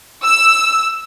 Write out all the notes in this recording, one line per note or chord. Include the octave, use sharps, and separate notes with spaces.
E6